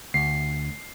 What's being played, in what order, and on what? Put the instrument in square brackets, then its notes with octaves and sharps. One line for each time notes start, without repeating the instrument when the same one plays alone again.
[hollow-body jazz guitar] D2 [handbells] C7